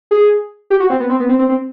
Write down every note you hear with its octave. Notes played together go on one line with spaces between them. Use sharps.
G#4
G4
F#4
C4
B3
C4
B3
C4
C4
C4